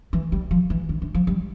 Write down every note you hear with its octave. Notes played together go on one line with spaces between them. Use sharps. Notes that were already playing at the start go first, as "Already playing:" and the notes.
E3
G3
F3
E3
D3
D3
F3
G3